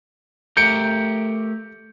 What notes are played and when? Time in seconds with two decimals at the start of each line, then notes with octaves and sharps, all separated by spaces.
0.57 A3 G4 A#4 G6 C#7 D7